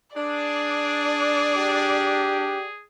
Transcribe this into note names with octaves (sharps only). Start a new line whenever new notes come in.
D4 G#4 D5
G4